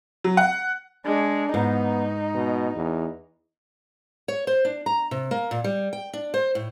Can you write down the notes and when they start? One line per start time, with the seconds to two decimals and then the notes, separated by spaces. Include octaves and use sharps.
0.24 F#3
0.37 F#5
1.06 G#3 D4
1.54 G#2 B3 D#4
2.35 B2
2.75 E2
4.28 C#5
4.47 C5
4.65 D4
4.86 A#5
5.11 C3
5.31 A#3
5.51 A#2
5.64 G3
5.93 G5
6.13 D4
6.34 C5
6.55 A2